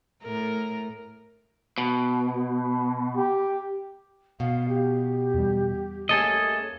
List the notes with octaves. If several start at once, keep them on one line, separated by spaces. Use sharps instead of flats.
A2 A3 A#4
B2
G4
B2 F5
G4
E2 G3
A3 A#3 C#4 G#4 A4 D#5